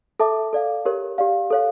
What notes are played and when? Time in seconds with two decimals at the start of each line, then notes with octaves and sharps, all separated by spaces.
0.20 A4 E5 A5 D6
0.53 A4 D5 F5
0.85 G4 A#4 C#5
1.18 G4 D5 F5
1.50 A4 C#5 F5